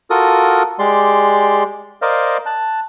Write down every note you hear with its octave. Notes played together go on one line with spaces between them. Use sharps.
F4 F#4 A4 A#4 D#6
G#3 G4 D5 C6
A#4 C5 D5 D#5 F5
A5 F#6